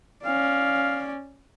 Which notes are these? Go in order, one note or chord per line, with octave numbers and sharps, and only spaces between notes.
C#4 D5 F5